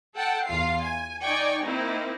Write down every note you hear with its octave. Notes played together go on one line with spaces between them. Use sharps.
A4 F#5 G5 A5
E2 F4 F5 C7
G#5
D#4 D5 G5 G#5 C#6
A#3 C4 D#4 E4